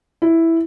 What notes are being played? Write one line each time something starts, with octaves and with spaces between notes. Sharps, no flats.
E4